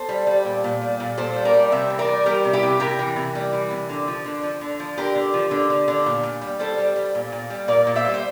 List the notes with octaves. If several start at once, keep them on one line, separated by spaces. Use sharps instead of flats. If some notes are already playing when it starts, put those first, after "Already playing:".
Already playing: A4 C5
G3
G3
A#2
A#2
G3
A#2
A#2 A4 C5
G3
A#4 D5
G3
C3 C5 E5
E3
A#4 D5
G3
G3 G4 A#4
C3
E4 G4
C3
C3 G4 A#4
E3
C3
G3
E3
C3
D3
F3
D3
F3
D3
F3
D3 G4 A#4
D3
F3
D3
D3
D3
A#2
A#2
G3
G3 A4 C5
G3
G3
A#2
A#2
G3
A#2 A#4 D5
A#2
C5 E5
G3
C5